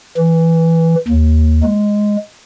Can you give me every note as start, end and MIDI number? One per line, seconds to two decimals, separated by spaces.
0.17 0.95 52
1.08 1.61 39
1.63 2.16 56